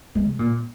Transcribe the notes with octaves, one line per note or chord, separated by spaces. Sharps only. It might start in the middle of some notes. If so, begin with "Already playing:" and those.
G#3
C3
A#2